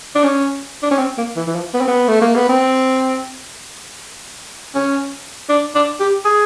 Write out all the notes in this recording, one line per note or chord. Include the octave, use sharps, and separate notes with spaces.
D4
C#4
D4
C#4
C4
A#3
E3
E3
F3
B3
C4
B3
A3
A#3
B3
C4
C#4
D4
D4
G4
G#4